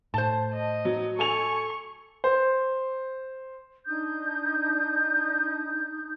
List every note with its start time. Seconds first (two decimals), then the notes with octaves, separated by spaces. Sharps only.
0.14 A2 C5 A5
0.54 D#5
0.85 F#3
1.19 A4 G#5 C#6 F7
2.24 C5
3.86 D4 D#4 D#6 G6